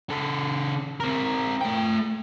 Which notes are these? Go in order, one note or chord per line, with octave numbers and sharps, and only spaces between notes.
C#3 A4
C4 A#4
A3 G5